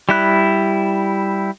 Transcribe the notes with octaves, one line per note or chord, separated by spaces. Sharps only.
G3 E4 F#6